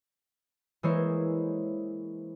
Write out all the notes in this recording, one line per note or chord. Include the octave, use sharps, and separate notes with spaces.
E3 G#3 A#3 E4 C5 C#5